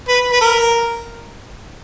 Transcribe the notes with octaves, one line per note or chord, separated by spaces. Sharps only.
B4
B4
A#4